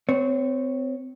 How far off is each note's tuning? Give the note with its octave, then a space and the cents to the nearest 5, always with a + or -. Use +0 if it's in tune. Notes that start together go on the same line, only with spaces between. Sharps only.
C4 -30 C#5 +0